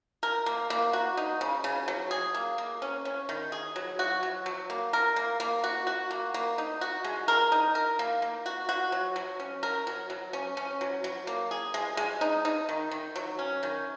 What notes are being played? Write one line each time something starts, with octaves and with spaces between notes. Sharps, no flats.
A#4
A#3
A#3
F#4
D#4
C#3
C#3
F#3
G#4
A#3
A#3
C#4
C#4
D#3
G#4
F#3
F#4
F#3
F#3
A#3
A#4
A#3
A#3
F#4
F#4
A#3
A#3
D#4
F#4
G#3
A#4
D#4
A#4
A#3
A#3
F#4
F#4
F#3
F#3
C#4
A#4
F#3
F#3
C#4
C#4
F#3
F#3
A#3
G#4
G#3
G#3
D#4
D#4
D#3
D#3
F#3
C#4
D#3